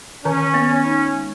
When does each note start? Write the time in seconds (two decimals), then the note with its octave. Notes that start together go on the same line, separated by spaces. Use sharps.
0.25 D#3 C#4
0.54 B3
0.70 C#4
0.85 D#4
1.14 G#3